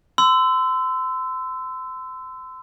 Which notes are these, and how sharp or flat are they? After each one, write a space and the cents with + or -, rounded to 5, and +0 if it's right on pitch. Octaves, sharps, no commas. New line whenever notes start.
C6 -35 E6 +0